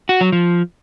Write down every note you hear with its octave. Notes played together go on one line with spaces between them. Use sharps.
F#4
F#3
F3